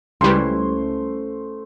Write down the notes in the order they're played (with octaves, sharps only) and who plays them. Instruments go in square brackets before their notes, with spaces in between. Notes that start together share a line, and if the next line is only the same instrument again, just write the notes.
[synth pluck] C#2 G3 [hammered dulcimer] A3 C5 [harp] C#4 E4 B4 [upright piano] C6